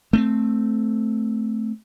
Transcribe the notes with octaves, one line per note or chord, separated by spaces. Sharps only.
A3 B3 C4